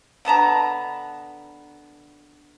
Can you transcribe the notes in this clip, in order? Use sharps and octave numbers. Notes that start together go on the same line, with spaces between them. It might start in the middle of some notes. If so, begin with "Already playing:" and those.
D3 B3 A5 A#5